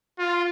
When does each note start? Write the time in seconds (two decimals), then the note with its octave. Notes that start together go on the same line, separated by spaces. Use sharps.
0.19 F4